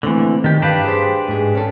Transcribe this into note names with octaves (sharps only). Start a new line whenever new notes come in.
D3 E3 A3 A#3 C4
D#3 G4
G2 D4 G4 B4 F5
G#4 C5
G#2 G#4
C#4 A4